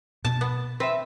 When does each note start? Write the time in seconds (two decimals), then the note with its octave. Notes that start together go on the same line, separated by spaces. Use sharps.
0.25 B2 A5
0.41 B3
0.80 C4 B4 E5